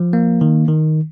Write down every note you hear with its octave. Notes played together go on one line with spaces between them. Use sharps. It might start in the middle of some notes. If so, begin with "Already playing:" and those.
Already playing: F3
A#3
D#3
D#3